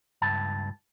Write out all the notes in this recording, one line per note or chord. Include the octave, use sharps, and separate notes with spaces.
C#2 G2 A5